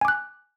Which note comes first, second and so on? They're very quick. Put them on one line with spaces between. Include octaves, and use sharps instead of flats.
G#5 D6 F#6